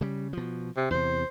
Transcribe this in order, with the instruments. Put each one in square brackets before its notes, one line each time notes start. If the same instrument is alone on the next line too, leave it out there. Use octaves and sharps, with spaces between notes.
[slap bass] C#3 G3
B2 F3
[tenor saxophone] C3
[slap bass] E2 C3 [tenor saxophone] C5